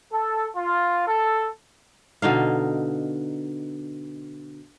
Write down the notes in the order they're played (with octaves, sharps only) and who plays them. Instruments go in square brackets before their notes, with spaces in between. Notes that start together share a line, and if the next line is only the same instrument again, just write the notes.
[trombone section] A4
F4
A4
[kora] B2 D3 D#4 F5